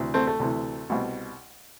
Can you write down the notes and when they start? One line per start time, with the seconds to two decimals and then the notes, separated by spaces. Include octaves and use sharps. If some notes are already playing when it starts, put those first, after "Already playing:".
Already playing: D2 C3 E3
0.14 A3 C4
0.27 A3
0.39 D2 C3 E3
0.90 C2 B2